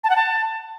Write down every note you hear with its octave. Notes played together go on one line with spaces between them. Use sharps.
A5
F#5
A5